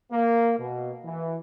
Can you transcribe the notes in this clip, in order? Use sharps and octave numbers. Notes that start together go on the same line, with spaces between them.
A#3
B2
E3